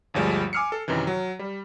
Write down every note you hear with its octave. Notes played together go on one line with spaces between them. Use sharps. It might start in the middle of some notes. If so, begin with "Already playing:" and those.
G1 D2 F3 G3 G#3
G#5 D6 E6 F6 C7 C#7
A4
F#2 C3 D#3 E3
F#3
G3